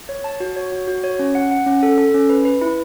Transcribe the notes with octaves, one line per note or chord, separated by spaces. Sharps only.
C#5
A5
F#4
C#5
F#4
F#4
C#5
C#4
F#5
F#5
C#4
A4
A4
C#4
B4
B4
E4